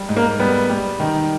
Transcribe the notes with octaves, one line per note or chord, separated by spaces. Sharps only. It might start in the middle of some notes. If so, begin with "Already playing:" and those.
Already playing: G3
G#2
A#3
G3 B3
G3
D#3